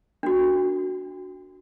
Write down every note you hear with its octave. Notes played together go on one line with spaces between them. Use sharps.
D4 F#4